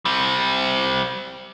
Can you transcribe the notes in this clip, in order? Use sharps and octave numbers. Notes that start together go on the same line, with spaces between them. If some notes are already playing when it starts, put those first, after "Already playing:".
G3 C4